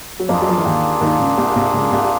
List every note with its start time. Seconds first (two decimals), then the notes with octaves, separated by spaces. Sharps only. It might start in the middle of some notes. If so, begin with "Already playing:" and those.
0.20 F#3
0.29 F2 F3 A#3 D4 F4 G#4
0.42 F#3
0.49 F3
0.58 E3
0.65 D#2 D#3
1.01 D#2 D#3
1.19 C#2 C#3
1.37 C2 C3
1.55 C2 C3
1.73 C#2 C#3
1.91 C2 C3